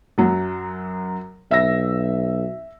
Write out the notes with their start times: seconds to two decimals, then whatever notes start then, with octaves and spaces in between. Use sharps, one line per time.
0.18 F#2 F#3
1.51 B1 E5 E6 A#6